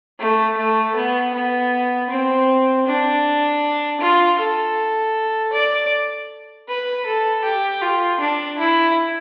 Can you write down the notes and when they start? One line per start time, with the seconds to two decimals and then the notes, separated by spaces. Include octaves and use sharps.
0.19 A3
0.58 A3
0.96 B3
1.34 B3
2.10 C4
2.86 D4
4.01 F4
4.39 A4
5.53 D5
6.68 B4
7.06 A4
7.44 G4
7.82 F4
8.20 D4
8.59 E4